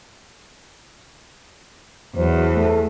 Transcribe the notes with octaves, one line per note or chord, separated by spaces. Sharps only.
E2 F#3 C5
A3